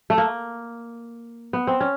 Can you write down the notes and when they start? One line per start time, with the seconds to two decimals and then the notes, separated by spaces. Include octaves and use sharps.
0.10 A3
0.18 A#3
1.53 B3
1.67 C4
1.80 C#4